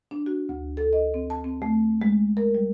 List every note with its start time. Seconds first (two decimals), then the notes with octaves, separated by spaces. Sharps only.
0.11 D4
0.26 F#4
0.49 D2
0.77 A4
0.93 D#5
1.14 C4
1.30 A5
1.44 C4
1.62 A3
2.02 G#3
2.37 A#4
2.55 G3